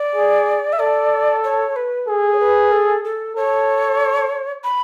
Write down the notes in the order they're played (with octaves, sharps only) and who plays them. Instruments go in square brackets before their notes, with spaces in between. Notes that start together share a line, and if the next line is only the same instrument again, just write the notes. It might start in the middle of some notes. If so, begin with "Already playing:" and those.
Already playing: [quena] D5
[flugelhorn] G#4
[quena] E5
[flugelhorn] A4 [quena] D5
[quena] C#5
B4
[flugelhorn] G#4 [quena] A4
[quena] C#5
B4
A4
A4
[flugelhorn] A4 [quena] C#5
[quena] B5